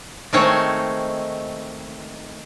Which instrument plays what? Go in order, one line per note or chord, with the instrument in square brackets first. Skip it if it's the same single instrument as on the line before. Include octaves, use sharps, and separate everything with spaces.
[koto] D#3 G#3 A3 C4 C5 C#5